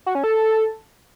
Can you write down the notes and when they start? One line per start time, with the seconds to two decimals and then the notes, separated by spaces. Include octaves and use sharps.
0.06 F#4
0.15 C#4
0.24 A4